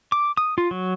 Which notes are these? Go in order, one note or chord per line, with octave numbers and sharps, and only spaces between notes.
D6
D#6
F4
F#3